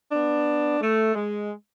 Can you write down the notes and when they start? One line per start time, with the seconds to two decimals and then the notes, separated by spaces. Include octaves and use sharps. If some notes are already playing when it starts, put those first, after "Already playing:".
0.12 B3 D4
0.81 A3
1.15 G#3